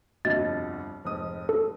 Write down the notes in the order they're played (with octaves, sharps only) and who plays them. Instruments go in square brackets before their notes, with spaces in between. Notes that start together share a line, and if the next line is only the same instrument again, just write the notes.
[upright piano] G1 C2 F2 [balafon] F#4 D#5 E5 [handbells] A6
[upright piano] F1 G#2 D#6
[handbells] A4